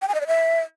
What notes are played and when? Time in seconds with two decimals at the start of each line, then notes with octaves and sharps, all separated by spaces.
0.02 G5
0.08 G#5
0.14 D#5
0.21 D5
0.27 E5